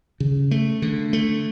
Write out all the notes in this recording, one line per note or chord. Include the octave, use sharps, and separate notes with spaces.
C#3
A3
D3
A3